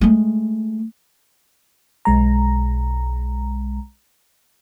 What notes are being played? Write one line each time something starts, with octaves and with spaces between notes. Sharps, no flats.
G#3 A3
B1 G#3 A#5